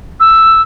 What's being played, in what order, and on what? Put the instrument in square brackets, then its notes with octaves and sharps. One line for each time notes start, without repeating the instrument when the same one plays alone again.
[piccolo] E6